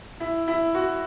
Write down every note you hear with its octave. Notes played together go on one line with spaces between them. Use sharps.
E4
E4
F#4